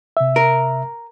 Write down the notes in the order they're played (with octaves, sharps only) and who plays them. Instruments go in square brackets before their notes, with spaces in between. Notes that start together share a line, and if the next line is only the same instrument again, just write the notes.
[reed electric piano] C3 E5
[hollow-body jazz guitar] A#4